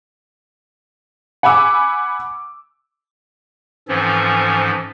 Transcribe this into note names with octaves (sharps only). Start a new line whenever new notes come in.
F#5 G#5 B5 D6 E6
G#2 E3 F3 C4 C#4 A4